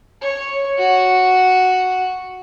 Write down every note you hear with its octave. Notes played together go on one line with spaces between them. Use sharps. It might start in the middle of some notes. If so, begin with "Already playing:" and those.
C#5
F#4